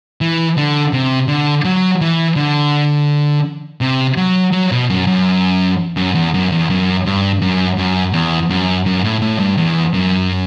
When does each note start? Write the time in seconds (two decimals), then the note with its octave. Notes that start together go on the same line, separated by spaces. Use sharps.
0.21 E3
0.57 D3
0.93 C3
1.28 D3
1.65 F#3
2.01 E3
2.36 D3
3.81 C3
4.17 F#3
4.52 F#3
4.72 B2
4.90 F#2
5.07 F#2
5.97 F#2
6.15 E2
6.34 F#2
6.52 E2
6.70 F#2
7.06 G2
7.42 F#2
7.78 F#2
8.13 E2
8.50 F#2
8.86 F#2
9.04 A2
9.22 A2
9.39 G2
9.57 E2
9.94 F#2